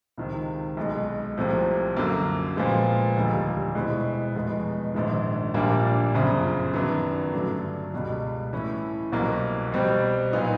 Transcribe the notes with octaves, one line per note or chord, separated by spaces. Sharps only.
C#2 C3 D#3
B1 B2 G#3
C2 C3 F3 A3
F#2 D3 F#3 A#3
A#2 F3 G#3 B3
F1 D#2 D3 G3
B2 G#3 C4 E4
F1 E2 B2 G#3 B3
A#1 G#2 D#3
A#1 A#2 G3 A#3 D4
G1 F#2 C#3 F3
F#2 D#3 F#3 B3 D4
G2 D3 F#3 A3 D4
C#2 B2 G3
A2 E3 A3 C#4 E4
C2 B2 F#3 A#3
B2 G3 C4
A#2 F#3 B3 D#4 F#4